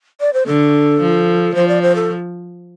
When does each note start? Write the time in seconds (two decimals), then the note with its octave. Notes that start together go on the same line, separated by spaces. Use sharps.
0.20 D5
0.33 C5
0.46 D3 A4
1.00 F3
1.55 F3 C5
1.68 D5
1.82 C5
1.95 A4